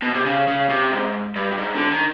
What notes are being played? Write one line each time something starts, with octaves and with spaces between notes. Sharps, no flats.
B2
C3
C#3
C#3
C3
G#2
G2
G2
G#2
D3
D#3